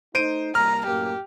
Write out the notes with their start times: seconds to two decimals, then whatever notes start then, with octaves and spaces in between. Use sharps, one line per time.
0.15 A3 D#4 C5 D7 D#7
0.55 C2 G3 A#3 A#5 F6
0.87 F#2 A2 A#3 G4